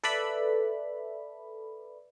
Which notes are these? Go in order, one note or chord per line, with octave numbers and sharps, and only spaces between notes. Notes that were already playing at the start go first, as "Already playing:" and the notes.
A4 B4 D5 E5 B5